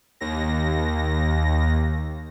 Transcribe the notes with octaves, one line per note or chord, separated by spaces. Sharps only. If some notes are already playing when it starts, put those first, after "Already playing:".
D#2 A#6